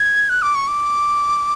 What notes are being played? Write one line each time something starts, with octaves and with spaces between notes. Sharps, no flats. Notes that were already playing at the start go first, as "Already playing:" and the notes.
Already playing: G#6
F#6
D6
C#6
D6